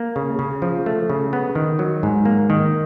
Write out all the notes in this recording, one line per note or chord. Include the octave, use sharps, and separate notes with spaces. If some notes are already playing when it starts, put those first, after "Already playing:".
Already playing: A#3
C#3
C#3
F3
A3
C#3
B3
D#3
F#3
G#2
A#3
D#3